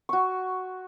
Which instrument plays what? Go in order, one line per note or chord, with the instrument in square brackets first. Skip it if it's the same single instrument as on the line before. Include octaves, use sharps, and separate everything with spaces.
[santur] F#4 C#6